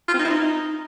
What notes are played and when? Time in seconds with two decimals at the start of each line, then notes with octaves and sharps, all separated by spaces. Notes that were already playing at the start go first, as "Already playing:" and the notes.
0.09 F4
0.14 C4
0.19 D#4
0.25 E4
0.30 D#4